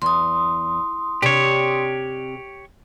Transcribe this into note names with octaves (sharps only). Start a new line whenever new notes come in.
E2 C6 D#6
C3 D4 G4 C#5